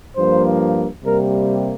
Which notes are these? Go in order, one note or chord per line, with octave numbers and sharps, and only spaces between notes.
G2 F3 A#3 C5
C3 G3 A#3 A#4